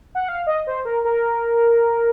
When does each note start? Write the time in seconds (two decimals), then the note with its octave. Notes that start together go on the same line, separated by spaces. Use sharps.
0.15 F#5
0.29 F5
0.47 D#5
0.67 C5
0.85 A#4
1.05 A#4